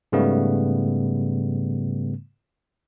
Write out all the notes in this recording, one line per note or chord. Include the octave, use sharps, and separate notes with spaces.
G#2 C#3 G3 A3 B3